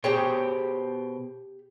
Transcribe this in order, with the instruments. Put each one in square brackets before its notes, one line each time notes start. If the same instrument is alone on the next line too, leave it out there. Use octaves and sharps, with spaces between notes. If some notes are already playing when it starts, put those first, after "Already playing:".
[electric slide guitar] B2 C5 G5 [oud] G4 G#4 C#5